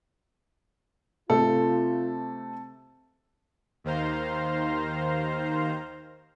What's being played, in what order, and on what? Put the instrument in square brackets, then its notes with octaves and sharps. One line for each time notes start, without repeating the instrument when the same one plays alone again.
[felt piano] C3 A3 [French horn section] F4 [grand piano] A4
[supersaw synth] D#2 D#3 C5 F5 A#5 C6